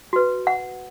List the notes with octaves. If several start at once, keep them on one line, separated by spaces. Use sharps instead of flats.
F#4 B4
F#5